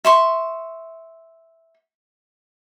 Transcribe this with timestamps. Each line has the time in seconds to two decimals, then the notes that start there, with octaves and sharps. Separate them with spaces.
0.05 E5 C6 C#6